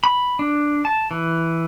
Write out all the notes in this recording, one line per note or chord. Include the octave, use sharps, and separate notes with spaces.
B5
D4
A5
E3